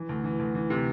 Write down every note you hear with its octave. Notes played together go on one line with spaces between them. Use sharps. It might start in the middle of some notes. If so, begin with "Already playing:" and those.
Already playing: E3
D2
E3
D2
E3
C3